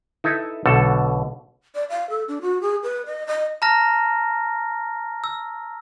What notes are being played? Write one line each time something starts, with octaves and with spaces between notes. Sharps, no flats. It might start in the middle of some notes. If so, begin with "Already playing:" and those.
D#4 E4 A4 B4 E5
B1 B2 D3 A4
D5
F5
A4
D4
F#4
G#4
B4
D#5
D#5
A5 A#5 F6 A#6
E6